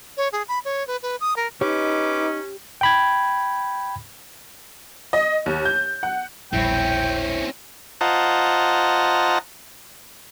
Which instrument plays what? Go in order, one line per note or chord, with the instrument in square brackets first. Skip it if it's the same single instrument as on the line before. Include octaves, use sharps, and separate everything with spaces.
[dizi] C#5
G#4
B5
C#5
B4
B4
D#6
A#4
[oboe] C#4 [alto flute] D#4 [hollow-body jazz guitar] G4 C#5 [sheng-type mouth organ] B4 D6
[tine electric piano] G5 B5 G#6
[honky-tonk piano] D#5
D#2
G6
F#5
[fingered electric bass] E1 A#1 G3 [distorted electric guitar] C4 C#4 [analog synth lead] E4 [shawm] G5
[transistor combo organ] F4 C5 D#5 F#5 A5 A#5